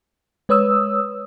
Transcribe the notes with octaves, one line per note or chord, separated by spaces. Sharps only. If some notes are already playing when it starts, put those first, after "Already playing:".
G#3 B4 C#5 D#6 E6